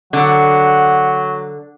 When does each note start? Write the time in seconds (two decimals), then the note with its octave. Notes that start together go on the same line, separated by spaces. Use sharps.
0.13 D3 F#3 F#5